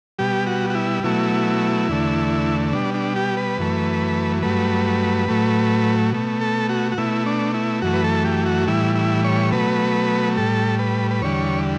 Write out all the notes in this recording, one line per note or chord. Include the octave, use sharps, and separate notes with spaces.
B2 G3 G4
F#4
F#4
E4
B2 F#3 A3 E4
E2 D3 A3
B2 G3 D4
D4
G4
B4
F#2 E3 A3
G2 F#3 A3 B4
A2 F#3 A3
B2 A3
A4
F#4
F#4
B2 A3 E4
D4
E4
F#2 E3 A3 F#4
B4
A4
G4
F#4
A2 E3 G3 E4
E4
C#5
B2 F#3 A3 B4
A2 G3 A4
B4
B4
E2 D3 G3 C#5